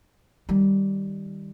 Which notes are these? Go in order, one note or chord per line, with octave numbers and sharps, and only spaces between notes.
D#3 G3